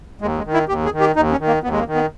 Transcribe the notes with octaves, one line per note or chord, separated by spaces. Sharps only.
D#2 G#3
G#3
D#3
E4
D#2 G4
G#4
D#3
G4
D#2 D#4
C#4
D#3
A#3
D#2 B3
G#3
A#3
D#3
B3